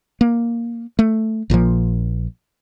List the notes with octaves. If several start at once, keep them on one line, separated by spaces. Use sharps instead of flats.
A#3
A3
A#1 A#2 D3 F3